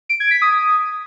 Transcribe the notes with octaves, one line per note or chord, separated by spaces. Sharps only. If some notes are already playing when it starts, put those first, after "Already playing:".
D7
G#6
B6
D#6